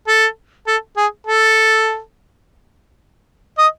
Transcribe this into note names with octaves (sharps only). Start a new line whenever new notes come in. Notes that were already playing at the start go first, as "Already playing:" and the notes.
A4
A4
G#4
A4
D#5